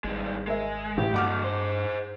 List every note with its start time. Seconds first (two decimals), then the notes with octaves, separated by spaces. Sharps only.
0.04 G#1 G2 G#3
0.47 G#3 A#4 E5
0.98 A1 G4
1.14 G2 F#3 A3 F#5 D6 F6
1.44 G#4 C5